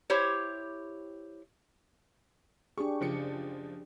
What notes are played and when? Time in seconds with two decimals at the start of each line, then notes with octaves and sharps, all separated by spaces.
0.10 E4 G4 C5 C#5
2.78 D4 G4 G#4 C#6
3.01 F#1 F3 C#7